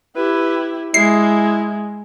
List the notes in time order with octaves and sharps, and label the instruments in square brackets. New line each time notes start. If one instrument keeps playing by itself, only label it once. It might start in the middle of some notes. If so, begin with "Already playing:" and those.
[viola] E4 G4 [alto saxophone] B4
[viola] G#3 [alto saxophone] E4 [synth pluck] C7